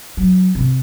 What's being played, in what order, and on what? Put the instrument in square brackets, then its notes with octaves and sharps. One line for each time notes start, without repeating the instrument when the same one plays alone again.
[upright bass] F#3
C3